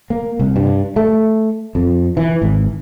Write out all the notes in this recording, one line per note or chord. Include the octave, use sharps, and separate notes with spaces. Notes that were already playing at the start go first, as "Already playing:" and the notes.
A#3
C2
G2
A3
F2
E3
G#1